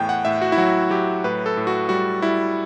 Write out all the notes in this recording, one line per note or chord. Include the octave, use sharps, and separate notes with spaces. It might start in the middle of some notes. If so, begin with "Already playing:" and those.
Already playing: E2 A2 G5
F#5
A2 E5
F#4
E4
F#3 F#4
F#3 G4
A2 B4
A4
A2
F#4
G3 F#4
G3 E4